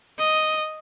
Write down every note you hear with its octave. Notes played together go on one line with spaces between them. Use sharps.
D#5